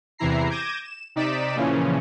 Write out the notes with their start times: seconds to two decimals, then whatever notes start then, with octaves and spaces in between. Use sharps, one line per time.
0.18 E2 C3 E3 E4 A#5 C7
0.49 D6 G6 G#6 A#6 D#7 E7
0.84 E7
1.16 C3 D#4 D5 B6 D7 E7
1.56 A#2 C#3 E3 F3 C#4